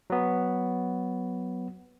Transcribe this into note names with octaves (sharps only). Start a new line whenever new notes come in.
F#3 B3